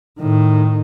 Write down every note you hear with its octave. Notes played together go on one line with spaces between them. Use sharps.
A2 D#3